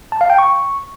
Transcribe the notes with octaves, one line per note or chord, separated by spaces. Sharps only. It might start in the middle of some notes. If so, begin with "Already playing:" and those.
A5
F5
G5
C#6